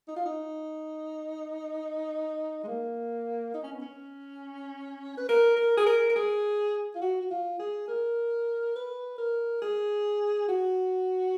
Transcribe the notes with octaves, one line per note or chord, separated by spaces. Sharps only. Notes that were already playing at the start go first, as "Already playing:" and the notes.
D#4
F4
D#4
G#3
A#3
D#4
C#4
B3
C#4
B4
A#4
A#4
G#4
A#4
A#4
G#4
F4
F#4
F#4
F4
G#4
A#4
B4
A#4
G#4
F#4